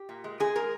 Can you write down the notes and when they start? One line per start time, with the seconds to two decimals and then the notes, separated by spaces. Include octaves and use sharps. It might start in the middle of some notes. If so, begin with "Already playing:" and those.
Already playing: G4
0.09 A#2
0.24 G#3
0.40 G#3 G#4
0.55 G#3 A#4